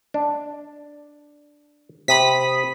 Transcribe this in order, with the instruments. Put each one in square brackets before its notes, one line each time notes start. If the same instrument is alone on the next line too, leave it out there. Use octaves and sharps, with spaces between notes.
[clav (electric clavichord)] D4
[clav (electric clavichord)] C3 [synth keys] B5 D#6 B6